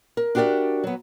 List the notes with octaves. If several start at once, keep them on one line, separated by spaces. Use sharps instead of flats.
A#4
D4 F#4 G4 A#4 D5 E5
F#3 B3